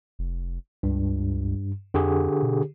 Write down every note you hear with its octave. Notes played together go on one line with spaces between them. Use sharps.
F1
C#2 G2
F2 D3 G4 G#4
B2